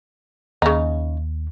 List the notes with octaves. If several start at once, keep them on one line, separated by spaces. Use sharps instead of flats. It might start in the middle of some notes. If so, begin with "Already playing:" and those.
D#2 C#3 D#4